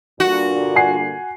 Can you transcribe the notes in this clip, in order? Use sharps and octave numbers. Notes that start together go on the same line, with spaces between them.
G2 A#2 D3 F#4
F#5 G#5 C7